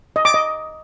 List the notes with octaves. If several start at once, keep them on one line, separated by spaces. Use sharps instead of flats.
D#5
D6
D#5